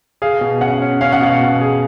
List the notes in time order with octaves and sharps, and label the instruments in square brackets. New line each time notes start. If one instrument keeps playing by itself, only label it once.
[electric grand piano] G#4 [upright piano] F5
[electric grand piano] B2
[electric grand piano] C#4 [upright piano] F#5
[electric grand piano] C#4
[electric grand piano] C#4 [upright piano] F5
[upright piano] F#5
[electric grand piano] B2 [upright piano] F5
[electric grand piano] B2
G#4